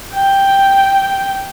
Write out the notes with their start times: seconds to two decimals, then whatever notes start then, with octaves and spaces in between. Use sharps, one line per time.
0.13 G5